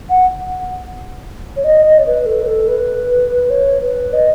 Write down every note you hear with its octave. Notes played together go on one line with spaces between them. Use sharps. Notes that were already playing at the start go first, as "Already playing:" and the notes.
F#5
C#5
D#5
D#5
C#5
B4
A4
B4
A4
B4
C#5
B4
D#5